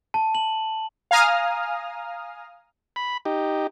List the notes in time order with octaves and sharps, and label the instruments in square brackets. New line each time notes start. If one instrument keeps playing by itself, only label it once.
[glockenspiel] A5
F#7
[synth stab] F5 G#5 A#5 D#6 F6
[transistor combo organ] B5
D#4 G4